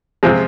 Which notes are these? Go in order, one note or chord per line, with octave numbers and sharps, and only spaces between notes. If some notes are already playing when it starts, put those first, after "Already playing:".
C3 F3 G#3 C4